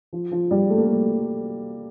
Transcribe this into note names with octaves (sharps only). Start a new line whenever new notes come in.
F3
F3
G3
A3
A#3
A3